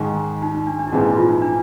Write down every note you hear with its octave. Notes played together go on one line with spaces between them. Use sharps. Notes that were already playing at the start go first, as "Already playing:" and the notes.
Already playing: G#2 D#3 G#3 D#4
D#4
D#4
D4
D4
E4
A#1 G#2 E3 G#3 C4 D#4
E4
F4
D#4
D4